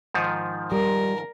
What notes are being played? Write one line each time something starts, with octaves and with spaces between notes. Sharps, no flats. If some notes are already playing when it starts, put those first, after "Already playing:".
G#2 D#3 F3
G3 A#4